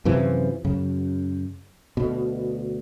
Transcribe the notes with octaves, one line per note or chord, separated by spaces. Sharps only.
F#2 C3 E3 F3
F#2 C#3
D2 B2